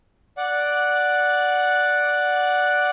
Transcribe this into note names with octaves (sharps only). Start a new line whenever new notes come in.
D5 F#5